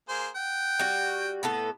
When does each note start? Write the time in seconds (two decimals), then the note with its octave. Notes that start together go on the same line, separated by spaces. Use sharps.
0.09 A#3 G#4 C5
0.35 F#5 G5
0.79 G3 F#4
1.43 A2 B3 A4